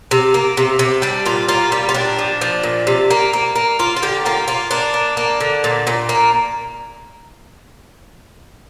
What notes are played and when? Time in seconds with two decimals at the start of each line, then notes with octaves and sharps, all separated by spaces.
0.11 C3
0.34 A#3
0.57 C3
0.79 C3
1.02 G3 D4
1.26 A#2 F4
1.48 A#3 F4
1.72 G3 G4
1.89 F4
1.94 A#2 D4
2.19 F3
2.41 F3
2.63 A#2
2.87 C3
3.10 A#3
3.33 A#3
3.55 A#3
3.79 A#3 F4
3.96 F4
4.02 D3 G4
4.26 A#3 F4
4.48 A#3 F4
4.71 A#3 D4
4.94 A#3
5.17 A#3
5.41 D3
5.64 A#2
5.87 A#2
6.09 A#3